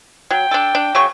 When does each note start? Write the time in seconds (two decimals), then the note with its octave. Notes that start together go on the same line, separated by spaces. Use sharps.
0.31 F#3 G5
0.51 D4 A4
0.75 D4
0.95 C#3 F#3 C#6